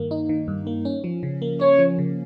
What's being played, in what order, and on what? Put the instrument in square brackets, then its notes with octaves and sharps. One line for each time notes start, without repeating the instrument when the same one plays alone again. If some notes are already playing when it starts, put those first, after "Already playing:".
Already playing: [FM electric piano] G2 D#3 A#3
D#4
D#3
G2
A#3
C#4
F3
C#3
A#3
[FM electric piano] C#4 [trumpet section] C#5
[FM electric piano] F3
C#3